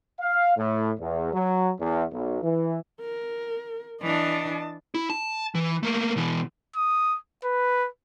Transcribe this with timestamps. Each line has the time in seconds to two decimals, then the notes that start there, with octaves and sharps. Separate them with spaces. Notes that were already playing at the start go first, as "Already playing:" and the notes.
0.19 F5
0.57 A2
0.99 E2
1.34 F#3
1.80 E2
2.12 B1
2.43 E3
3.01 A#4
4.02 E3 D4 D#5 A5
4.94 E4
5.10 A5
5.55 E3
5.83 A3 A#3
6.16 B2 E3
6.76 D#6
7.44 B4